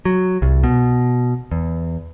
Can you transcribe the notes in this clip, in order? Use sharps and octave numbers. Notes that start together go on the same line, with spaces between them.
F#3
C2
B2
E2